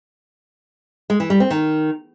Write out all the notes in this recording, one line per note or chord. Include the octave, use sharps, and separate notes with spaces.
G#3
E3
G3
C4
D#3